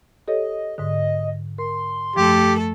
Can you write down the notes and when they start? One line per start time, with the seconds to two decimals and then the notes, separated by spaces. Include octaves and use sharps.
0.28 G4 A4 C#5 D#5
0.78 G#2 D3 D#5
1.58 A#4 C6
2.16 F#2 F3 A3 G4 A4